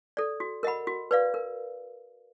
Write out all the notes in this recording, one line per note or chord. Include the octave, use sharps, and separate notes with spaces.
A4 D5
F#4
A#4 D#5 F#5 B5
F#4
B4 D5 F5
A#4